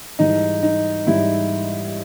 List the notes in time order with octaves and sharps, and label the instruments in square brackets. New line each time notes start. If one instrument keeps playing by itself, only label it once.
[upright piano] G#2 E3 G3 [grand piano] D#4
[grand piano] D#4
[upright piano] G#2 E3 G3 [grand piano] E4